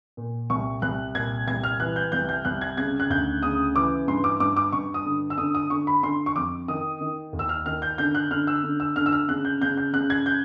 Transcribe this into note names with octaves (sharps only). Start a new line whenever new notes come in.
A#2
C2 C#6
C2 F#6
A#2 G#6
C2 G#6
F6
E3 F#6
G6
C2 G6
G6
C2 F#6
G#6
C#3 G#6
F#6
D2 G6
C#3 D#6
E3 D6
G2 C6
D6
G2 D6
D6
G2 C#6
D#6
D3
E6
D3 D#6
D#6
D3 C#6
B5
D3 C6
C#6
F2 D6
D#3 D#6
D#3
D#2
E6
F6
D#3 F6
G6
D3 G6
F#6
D3 F6
E6
D3
E6
D3 F6
E6
F6
C#3 F#6
G6
C#3 G6
G6
C#3 F#6
G#6
G6